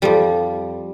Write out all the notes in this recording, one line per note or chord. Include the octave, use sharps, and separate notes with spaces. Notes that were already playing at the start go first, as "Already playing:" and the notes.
F2 F3 G3